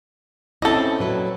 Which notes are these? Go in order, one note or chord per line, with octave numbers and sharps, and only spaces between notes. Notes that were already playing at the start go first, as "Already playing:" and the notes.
C4 C#4 E4 A4 D#5
A#2 F#3 B4